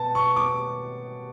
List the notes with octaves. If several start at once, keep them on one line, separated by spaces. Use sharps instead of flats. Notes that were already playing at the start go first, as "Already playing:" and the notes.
Already playing: B2 B3 A5
C#6
D6